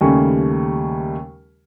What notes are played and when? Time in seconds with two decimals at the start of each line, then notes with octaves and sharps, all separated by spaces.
0.01 D#2 C#3 G3 A3 G#5 C#6